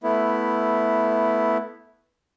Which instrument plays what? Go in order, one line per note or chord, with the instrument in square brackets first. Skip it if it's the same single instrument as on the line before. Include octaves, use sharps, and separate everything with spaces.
[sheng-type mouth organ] A3 B3 E4